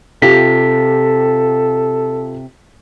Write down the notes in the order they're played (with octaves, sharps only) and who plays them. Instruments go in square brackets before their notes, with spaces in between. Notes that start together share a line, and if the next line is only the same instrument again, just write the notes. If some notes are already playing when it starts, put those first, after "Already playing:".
[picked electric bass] C3 [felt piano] F4 G4 [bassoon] A4 [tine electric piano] B6